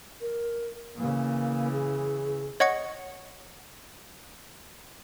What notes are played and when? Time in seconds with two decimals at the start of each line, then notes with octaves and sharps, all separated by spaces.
0.21 A#4
0.97 C#3 E3 A#3
1.72 G#4
2.60 C#5 D#5 F#5 C#6 G#6 C#7